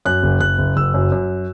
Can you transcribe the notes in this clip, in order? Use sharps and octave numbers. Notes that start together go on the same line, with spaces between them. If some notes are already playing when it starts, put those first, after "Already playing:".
F#2 F#6
F#1
F#1 F#6
F#1
F#1 E6
F#2
F#2